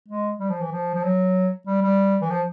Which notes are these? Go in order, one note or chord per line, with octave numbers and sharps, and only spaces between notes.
G#3
G3
F3
E3
F3
F3
F#3
G3
G3
E3
F3